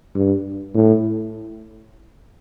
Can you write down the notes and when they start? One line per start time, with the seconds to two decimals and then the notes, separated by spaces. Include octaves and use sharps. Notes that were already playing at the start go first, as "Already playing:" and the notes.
0.15 G2
0.75 A2